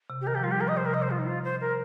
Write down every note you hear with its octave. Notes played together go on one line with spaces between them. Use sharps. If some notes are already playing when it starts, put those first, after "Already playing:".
C3
G4
D#3 A#4
F3 G4
G3 F4
G4
F3 A#4
D#5
D#3
C5
C3
A#4
C3 D#5
C5
F4
D#4
F4
C5
A#4